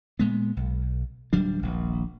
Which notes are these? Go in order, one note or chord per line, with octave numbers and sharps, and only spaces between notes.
A#2 G#3 B3
B1
D1 F#3 G3 D4
D#1 A#1